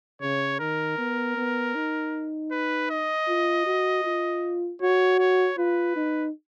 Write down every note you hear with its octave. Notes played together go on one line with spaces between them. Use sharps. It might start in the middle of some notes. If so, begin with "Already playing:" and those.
C#3 C#5
D#3 A#4
B3
B3
D#4
B4
D#5
F4
F#4
F4
F#4 C#5
C#5
F4 B4
D#4